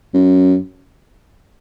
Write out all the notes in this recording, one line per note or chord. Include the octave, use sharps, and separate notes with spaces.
F#2